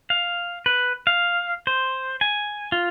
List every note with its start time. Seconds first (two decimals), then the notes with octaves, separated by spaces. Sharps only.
0.10 F5
0.66 B4
1.07 F5
1.67 C5
2.21 G#5
2.72 F4